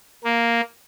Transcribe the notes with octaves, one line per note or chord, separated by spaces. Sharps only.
A#3